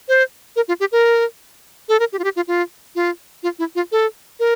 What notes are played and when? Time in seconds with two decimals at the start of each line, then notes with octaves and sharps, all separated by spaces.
0.08 C5
0.56 A#4
0.68 F4
0.80 G4
0.92 A#4
1.89 A4
2.00 A#4
2.13 G4
2.19 F4
2.24 G4
2.36 F4
2.48 F4
2.95 F4
3.43 F4
3.59 E4
3.75 F4
3.92 A4
4.40 A#4